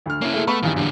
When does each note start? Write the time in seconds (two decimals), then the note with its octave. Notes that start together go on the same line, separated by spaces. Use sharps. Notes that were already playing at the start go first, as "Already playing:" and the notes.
0.06 D2 F6
0.21 A#3 C#4 E4
0.34 G#3 A3
0.47 A3 B3 B5 C#6
0.63 A#1 E2 G2 D#3
0.76 F#2 D3